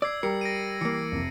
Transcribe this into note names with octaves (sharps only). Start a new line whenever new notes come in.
D5 E6 G#6 C7
G3 A#4 C7 C#7
A#6 D7 D#7
E3 A#3 C#7
F1